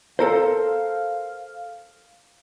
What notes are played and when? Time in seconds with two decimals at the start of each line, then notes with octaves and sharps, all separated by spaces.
0.19 A4 A#4 C5 F5